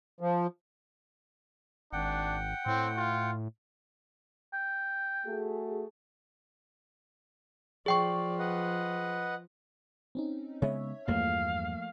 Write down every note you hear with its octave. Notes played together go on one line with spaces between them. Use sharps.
F3
G#1 D4 F#5 G5
A2 C4
F4
G5
A3 F#4 G#4
F3 G#4 D5 G5 C#6
B4 D#5 F#5
C4 C#4 D#4
C#3 G#3 B3 C#5 E5
E2 G2 F3 A3 A#3 F5